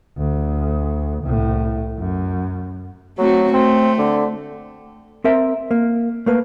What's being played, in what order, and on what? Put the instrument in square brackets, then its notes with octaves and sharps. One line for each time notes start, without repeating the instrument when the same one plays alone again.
[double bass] D2
C2 A2
F#2
[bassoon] F#3 [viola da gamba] A3 C4 F#4
[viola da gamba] A3 [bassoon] C4
[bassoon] D3
[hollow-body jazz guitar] C4 A#4 E5
A#3
A3 A#3 B4